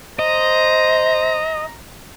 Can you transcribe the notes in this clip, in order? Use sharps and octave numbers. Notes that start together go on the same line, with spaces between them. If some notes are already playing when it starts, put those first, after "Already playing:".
C5 D#5 A#5